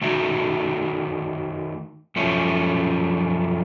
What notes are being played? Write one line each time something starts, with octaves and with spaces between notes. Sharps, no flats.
D#3 A3 D#4 F#4
F#2 F3 A3 C#4